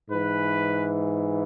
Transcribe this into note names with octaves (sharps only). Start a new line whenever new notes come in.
G#2 E3 B4